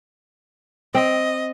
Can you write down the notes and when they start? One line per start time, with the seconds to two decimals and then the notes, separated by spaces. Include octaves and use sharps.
0.95 C4 D#5